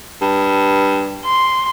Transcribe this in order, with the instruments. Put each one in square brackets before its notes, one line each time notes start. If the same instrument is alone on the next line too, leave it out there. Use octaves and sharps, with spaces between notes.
[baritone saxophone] G2
[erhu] C6